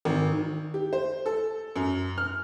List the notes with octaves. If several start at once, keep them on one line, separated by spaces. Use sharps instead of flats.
G#1
D#3
G4
C5
A4
F#2
F6